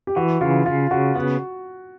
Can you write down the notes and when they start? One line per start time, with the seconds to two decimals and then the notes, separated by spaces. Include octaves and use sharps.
0.07 G4
0.16 E3 F#4
0.41 C#3 F4
0.66 C#3 F4
0.91 C#3 F#4
1.16 B3 F#4